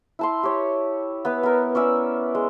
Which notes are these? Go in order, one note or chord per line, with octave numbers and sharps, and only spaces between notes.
E4 A5 C6
G4 C#5
B3 E4 B4
B3 A#4
C#4 D5 E5 E6
G#3